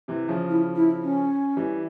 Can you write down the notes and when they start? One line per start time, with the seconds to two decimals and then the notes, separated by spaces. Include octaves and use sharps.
0.08 C3 E3
0.29 C#3 F3
0.49 E4
0.76 E4
1.02 C#4
1.57 E3 G3